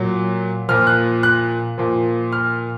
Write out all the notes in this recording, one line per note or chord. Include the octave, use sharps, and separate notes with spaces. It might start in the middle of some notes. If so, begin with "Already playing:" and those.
Already playing: A#2 F#3
A#2 F3 F6
F#6
F#6
A#2 F3
F6